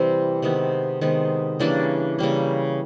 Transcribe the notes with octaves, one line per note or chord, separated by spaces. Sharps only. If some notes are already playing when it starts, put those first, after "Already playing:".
Already playing: C3 E3 G3 C4
C3 D#3 G#3 B3
C3 D#3 G#3 B3
C#3 E3 G3 A#3 D4
C#3 E3 G3 A#3